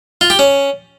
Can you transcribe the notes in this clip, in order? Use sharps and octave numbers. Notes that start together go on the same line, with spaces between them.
F4
G4
C#4